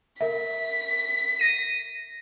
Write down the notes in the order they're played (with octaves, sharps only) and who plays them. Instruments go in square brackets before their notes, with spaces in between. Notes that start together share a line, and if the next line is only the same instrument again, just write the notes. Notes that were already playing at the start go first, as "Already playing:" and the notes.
[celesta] A#4 E5 [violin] B6
[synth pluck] A#6 D#7